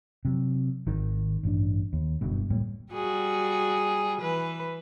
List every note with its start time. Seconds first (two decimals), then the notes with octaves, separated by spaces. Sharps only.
0.25 C3 F#3
0.87 G#1 D#3
1.43 A1 G2 D4
1.93 D#2
2.21 F#1 G2 B2
2.50 D1 A2 G3 A#3
2.92 G3 F#4 G#4
4.21 E3 B4